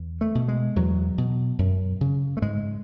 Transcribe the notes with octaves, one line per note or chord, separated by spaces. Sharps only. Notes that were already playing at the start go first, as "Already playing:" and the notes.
Already playing: E2
A3
B2
G#3
E2 F#3
B2
F#2
C#3
A3
G#2 G#3